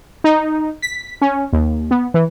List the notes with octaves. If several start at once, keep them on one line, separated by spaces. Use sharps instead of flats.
D#4
B6
C#4
D#2
B3
E3